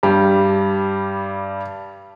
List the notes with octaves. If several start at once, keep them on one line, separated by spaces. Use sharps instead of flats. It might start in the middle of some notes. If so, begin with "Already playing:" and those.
G2 G3